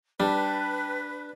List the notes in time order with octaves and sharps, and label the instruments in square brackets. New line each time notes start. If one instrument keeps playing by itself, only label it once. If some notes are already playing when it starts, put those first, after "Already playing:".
[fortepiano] G3 [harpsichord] D4 [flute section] B4 [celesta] G5 A5